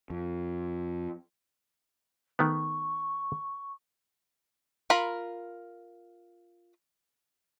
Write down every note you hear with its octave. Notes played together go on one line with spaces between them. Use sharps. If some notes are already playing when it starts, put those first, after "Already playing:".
F2
D#3 A3 B3 C#6
F4 A#4 B5